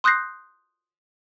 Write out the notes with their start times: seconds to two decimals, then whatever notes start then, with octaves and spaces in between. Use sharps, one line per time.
0.04 C6 D#6 F#6 G6 A#6 C7